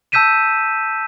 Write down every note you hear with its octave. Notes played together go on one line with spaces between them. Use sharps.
A5 E6 G6 B6 D#7 E7